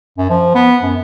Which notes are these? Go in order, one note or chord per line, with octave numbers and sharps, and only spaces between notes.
F#2
F3
B3
F#2